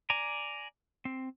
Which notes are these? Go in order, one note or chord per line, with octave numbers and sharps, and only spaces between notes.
D5 G#5 A#5
C4